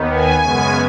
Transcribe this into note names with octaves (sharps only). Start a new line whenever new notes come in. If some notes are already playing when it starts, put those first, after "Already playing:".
Already playing: D#2 D#3 B3
G#5
F#2 C#3 G#3 B3